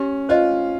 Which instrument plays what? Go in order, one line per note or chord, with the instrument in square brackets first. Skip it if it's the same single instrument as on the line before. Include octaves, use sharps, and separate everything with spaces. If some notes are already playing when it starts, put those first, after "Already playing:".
Already playing: [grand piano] C#4 [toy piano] G4
[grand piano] F4 [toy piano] C5 D#5